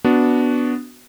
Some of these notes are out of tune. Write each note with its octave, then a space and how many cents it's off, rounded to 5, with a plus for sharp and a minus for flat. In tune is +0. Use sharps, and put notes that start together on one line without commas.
B3 +0 D4 -15 F#4 +0